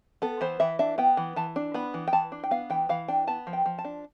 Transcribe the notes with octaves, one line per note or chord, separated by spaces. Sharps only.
B3 A4
E3 C5
E3 E5
D4 E5
B3 G5
E3
E3 A5
D4
B3 B5
E3
G5
E3 A5
D4
G5
B3 F5
E3 G5
E3 F5
D4 G5
B3 A5
F3
G5
F3
A5
D4